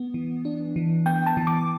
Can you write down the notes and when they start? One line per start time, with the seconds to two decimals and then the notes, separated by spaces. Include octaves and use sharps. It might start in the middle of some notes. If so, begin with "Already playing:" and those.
Already playing: B3
0.14 E3
0.45 D4
0.76 E3
1.06 B3 G5
1.26 A5
1.37 E3
1.47 D6